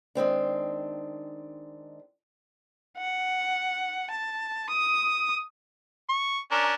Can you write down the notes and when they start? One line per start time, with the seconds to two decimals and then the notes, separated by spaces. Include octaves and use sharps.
0.15 D#3 G#3 C4 D4
2.97 F#5
4.11 A5
4.69 D#6
6.09 C#6
6.52 C#4 D4 A#4